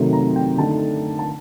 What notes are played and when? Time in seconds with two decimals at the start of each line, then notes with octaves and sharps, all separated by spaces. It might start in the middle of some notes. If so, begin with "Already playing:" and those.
Already playing: C3 D#3 F#3 A3
0.13 A#5
0.36 G5
0.58 D3 A3 D#4 A5
1.19 A5